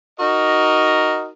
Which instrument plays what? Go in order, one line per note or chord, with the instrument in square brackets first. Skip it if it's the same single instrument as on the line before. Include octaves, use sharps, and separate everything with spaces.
[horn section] D#4 F#4 A#4 D#5